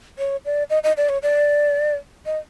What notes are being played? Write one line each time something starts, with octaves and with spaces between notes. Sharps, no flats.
C#5
D5
D#5
D#5
D5
C#5
D5
D#5